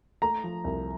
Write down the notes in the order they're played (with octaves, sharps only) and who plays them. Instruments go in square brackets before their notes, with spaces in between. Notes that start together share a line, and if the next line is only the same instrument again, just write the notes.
[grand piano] A3 A#5
F3
C2